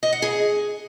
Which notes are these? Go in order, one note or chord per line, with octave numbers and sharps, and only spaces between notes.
D#5
F#5
G#4